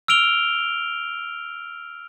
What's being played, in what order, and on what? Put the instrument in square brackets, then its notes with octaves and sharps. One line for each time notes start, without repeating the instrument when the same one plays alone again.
[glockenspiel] E6 F6 D7 F7 G7